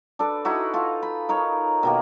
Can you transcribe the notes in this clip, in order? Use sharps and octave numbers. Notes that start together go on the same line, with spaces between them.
D4 A4 B4
D#4 E4 F#4
F4 A4
B5
D#4 A#4 C#5
B2 D#3 A#3